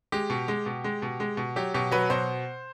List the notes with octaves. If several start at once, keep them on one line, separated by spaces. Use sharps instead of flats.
G#3 G4
B2
G#3
B2
G#3
B2
G#3
B2
F#3 G4
B2 G4
F#3 B4
B2 C5